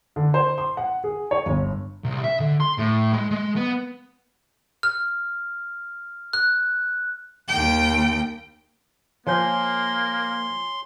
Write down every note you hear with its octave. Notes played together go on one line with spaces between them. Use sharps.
D3
C5
C6
F#5
G#4
C#5
G1
C2
E5
D3
C6
A2
G#3
G#3
B3
F6
F#6
D#2 G5
F3 A#3 C#5 G#5 C6 G6